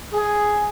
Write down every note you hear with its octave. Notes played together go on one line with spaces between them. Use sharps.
G#4